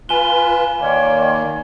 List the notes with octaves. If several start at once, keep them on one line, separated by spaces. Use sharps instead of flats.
F4 B4 G#5 E7 G7
D#3 A#3 C#5 D5 C6